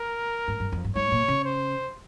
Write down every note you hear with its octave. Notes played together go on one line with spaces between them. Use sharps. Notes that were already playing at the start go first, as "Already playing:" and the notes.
Already playing: A#4
G#2
G2
F2
G2
G#2 C#5
A#2
C#3
C5